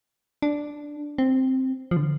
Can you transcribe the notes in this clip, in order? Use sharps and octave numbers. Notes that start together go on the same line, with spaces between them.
D4
C4
F3
D3